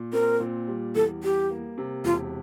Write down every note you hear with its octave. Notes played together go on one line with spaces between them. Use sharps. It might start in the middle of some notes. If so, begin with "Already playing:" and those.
Already playing: A#2
C4 A#4
A#2
G3
E2 A4
G3 G4
A#3
C3
E1 F4